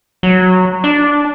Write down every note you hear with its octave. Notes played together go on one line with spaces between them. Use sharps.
F#3
D4